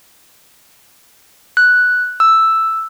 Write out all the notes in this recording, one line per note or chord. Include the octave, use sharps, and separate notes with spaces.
F#6
E6